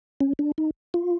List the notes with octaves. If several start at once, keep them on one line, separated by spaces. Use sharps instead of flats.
C#4
D4
D#4
F4